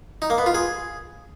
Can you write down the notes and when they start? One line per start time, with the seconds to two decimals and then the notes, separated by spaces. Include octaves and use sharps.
0.22 D#4
0.30 A#3
0.38 B3
0.46 F4
0.55 G#4